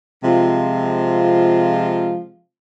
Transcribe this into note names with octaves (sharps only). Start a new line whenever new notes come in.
C3 F3 G#3 C4 F4